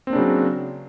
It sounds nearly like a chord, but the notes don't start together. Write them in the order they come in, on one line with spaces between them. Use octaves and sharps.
C4 A#3 D4 C#3 F#3